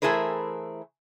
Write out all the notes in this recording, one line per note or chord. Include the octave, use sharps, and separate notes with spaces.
E3 A3 E4 G#4 A#4 C5